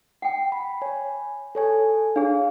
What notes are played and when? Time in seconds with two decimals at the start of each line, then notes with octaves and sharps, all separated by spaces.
0.22 F#5 G5
0.52 B5
0.82 C#5 G#5
1.55 A4 C#5 G#5
2.16 D4 G#4 C#5 F5